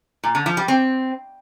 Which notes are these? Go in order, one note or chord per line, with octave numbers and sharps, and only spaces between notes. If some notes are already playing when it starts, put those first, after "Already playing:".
A#2
D3
F3
G3
C4